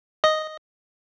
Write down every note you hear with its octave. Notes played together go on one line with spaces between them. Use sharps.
D#5